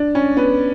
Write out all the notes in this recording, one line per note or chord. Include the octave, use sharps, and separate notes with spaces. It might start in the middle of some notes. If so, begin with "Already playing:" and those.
Already playing: D4
C#4
B3